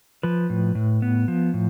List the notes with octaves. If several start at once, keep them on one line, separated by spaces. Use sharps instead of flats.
F3 B4
A2
A2
B3
F3
A2